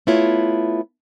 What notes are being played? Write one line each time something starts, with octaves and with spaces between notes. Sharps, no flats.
A3 B3 E4 F4 C#5